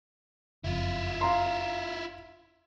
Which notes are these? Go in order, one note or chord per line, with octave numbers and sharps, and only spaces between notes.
F#1 F2 E4 F4
F5 A#5 C6